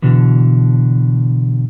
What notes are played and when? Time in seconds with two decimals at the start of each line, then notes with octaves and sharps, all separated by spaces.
0.02 B2 D3 E3